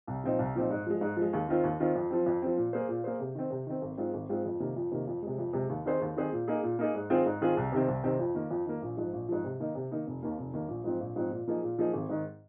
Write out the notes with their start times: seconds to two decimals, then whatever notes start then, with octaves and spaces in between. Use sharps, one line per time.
0.07 C2
0.24 A#2 F3 C4 D#4
0.39 C2
0.55 A#2 F3 C4 D#4
0.70 G#2
0.86 F3 G#3
1.01 G#2
1.16 F3 G#3
1.33 D#2
1.48 D#3 C4 F4
1.64 D#2
1.80 D#3 C4 F4
1.96 F2
2.10 F3 C4
2.26 F2
2.42 F3 C4
2.57 A#2
2.73 A#3 G#4 C5
2.89 A#2
3.04 A#3 G#4 C5
3.20 C3
3.35 D#3 C4
3.50 C3
3.67 D#3 C4
3.82 G#1
3.97 G#2 G#3 C4 F4
4.14 G#1
4.29 G#2 G#3 C4 F4
4.45 F2
4.60 C3 D#3 A#3
4.76 F2
4.92 C3 D#3 A#3
5.07 F2
5.22 C3 G#3
5.38 F2
5.53 C3 G#3
5.69 D#2
5.85 D#3 C4 G#4 C5
6.01 D#2
6.17 D#3 C4 G#4 C5
6.32 A#2
6.48 A#3 D#4 G#4
6.63 A#2
6.79 A#3 D#4 G#4
6.94 G#2
7.10 D#3 C4 F4 G#4
7.26 G#2
7.41 D#3 C4 F4 G#4
7.57 C2
7.72 C3 D#3 C4
7.88 C2
8.04 C3 D#3 C4
8.19 F2
8.35 D#3 A#3
8.50 F2
8.66 D#3 A#3
8.82 A#1
8.97 G#2 F3
9.13 A#1
9.28 G#2 F3
9.44 C3
9.60 D#3 A#3 D#4
9.75 C3
9.91 D#3 A#3 D#4
10.07 F1
10.22 D#2 D#3 A#3
10.38 F1
10.53 D#2 D#3 A#3
10.68 A#1
10.84 G#2 F3 C4
11.00 A#1
11.16 G#2 F3 C4
11.31 A#2
11.47 F3 A#3 D#4 G#4
11.63 A#2
11.78 F3 A#3 D#4 G#4
11.94 G#1
12.09 G#2 D#3